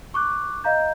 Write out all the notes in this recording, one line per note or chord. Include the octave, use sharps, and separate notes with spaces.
C#6 D6 F#6
D#5 F5 A#5 G6